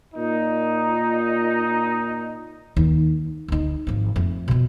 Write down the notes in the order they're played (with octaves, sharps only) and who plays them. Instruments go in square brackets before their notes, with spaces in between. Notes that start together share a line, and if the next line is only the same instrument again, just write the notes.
[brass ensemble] A#2 D#4
[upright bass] D#2
D2 D#4
G#1 F3
F2 A3
B2 F3